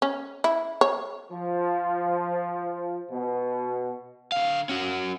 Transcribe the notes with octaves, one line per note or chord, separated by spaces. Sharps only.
C#4
E4
C#5
F3
B2
D3 F5
C#4 F#4